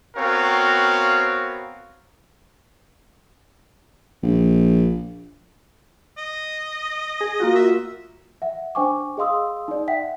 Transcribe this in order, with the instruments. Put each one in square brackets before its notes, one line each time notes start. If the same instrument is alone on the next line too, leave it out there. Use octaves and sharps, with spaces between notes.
[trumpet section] B3 C4 F#4 A#4 C#5 F5
[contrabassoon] A#1
[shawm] D#5
[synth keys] G#4
A#3 F4 F#4
[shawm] E5
[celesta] E5 F#5
D4 C5 G5 G#5 C#6 D6
G#4 D#5 F5 C6 D#6 E6
D#4 D5
E5 F#5 G5 B6